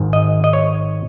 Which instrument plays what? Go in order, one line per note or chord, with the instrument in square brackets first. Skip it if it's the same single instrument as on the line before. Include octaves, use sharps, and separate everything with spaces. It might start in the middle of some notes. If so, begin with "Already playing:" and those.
Already playing: [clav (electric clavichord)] G#1 G#2 D#3
D#5
D#5
C#5